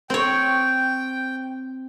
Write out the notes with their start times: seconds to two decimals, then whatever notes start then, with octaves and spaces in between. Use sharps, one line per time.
0.10 C4 C#5 G5